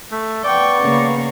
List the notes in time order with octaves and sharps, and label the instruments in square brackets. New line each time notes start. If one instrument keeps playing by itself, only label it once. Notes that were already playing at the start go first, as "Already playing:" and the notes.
[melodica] A3
[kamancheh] B3 C#6 [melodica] D5 [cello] G5
[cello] C#3 A#3